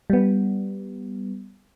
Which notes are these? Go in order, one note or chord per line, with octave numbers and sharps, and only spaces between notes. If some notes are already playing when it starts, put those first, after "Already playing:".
G3 B3